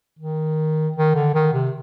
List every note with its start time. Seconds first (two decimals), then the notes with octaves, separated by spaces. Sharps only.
0.19 D#3
0.96 D#3
1.15 D3
1.34 D#3
1.53 C3